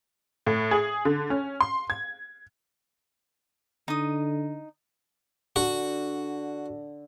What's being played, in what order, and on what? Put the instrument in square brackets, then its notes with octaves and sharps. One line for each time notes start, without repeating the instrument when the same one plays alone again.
[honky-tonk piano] A2
G#4
D3
C#4
C6
G#6
[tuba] D3 [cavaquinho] D#4 D#6
[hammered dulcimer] D3 [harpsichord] F#4